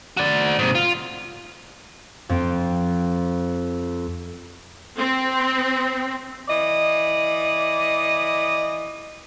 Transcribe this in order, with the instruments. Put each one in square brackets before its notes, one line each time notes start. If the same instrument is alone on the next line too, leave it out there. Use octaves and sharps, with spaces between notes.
[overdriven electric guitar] F#4 D5
G#2 C3
F4
[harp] F2 C4 G5
[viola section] C4
[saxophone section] E3 D5 D#5